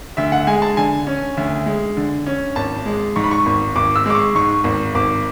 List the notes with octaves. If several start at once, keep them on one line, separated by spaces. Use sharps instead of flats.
D2 E5
F#5
G#3 G#5
A5
D3 G#5
C#4
D2
G#3
D3
C#4
G#1 A5
G#3
G#2 C#6
B5
C#6
G#1
G#1 D6
E6
G#3 D6
C#6
G#2 C#6
G#1
G#1 D6